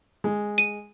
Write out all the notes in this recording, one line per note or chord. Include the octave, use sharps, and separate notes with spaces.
G#3
D#7